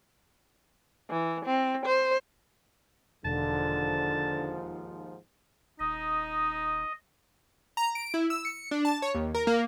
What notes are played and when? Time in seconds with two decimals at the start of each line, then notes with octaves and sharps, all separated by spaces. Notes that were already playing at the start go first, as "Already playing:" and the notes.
1.10 E3
1.45 C4
1.86 C5
3.25 E1 D#2 G#2 D3 F3 A5
5.80 D#1 D#4 D#5
7.77 A#5
7.95 D7
8.14 E4
8.30 E6
8.45 C#7
8.71 D4
8.85 A5
9.02 C#5
9.15 D#2
9.34 A#4
9.47 A#3